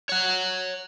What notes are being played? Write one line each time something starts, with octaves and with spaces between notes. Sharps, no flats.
C#5 F#5